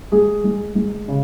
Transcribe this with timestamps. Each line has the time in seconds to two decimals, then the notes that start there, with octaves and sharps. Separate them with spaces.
0.12 G#3 G#4
0.44 G#3
0.75 G#3
1.08 C#3